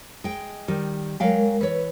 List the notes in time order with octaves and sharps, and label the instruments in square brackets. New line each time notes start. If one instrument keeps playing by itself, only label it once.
[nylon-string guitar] G#3 G5
D#3 G3
[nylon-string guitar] F#3 F5 G5 [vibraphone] G#3 A#4
[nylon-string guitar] E3 C#5 [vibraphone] B4